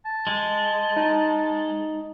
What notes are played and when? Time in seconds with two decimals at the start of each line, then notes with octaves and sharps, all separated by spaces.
0.05 A5
0.27 G#3
0.97 D#4